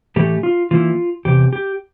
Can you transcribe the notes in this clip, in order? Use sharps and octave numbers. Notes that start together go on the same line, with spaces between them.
A2 E3 A3 G4
F4
E3 A#3 E4 F4
E2 C3 G4
G4